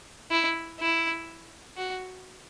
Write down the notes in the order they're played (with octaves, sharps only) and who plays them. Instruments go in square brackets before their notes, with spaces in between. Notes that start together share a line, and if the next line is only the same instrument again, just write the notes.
[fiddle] E4
E4
F#4